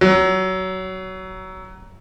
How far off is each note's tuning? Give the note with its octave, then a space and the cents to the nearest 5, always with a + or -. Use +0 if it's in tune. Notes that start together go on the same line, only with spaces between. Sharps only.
F#3 +20